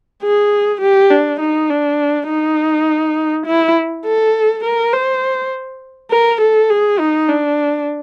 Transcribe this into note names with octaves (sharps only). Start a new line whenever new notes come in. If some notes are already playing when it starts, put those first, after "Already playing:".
G#4
G4
D4
D#4
D4
D#4
E4
A4
A#4
C5
A#4
A4
G#4
D#4
D4